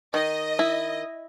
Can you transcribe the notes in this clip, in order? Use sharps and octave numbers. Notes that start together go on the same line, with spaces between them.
D#3 D#5
E4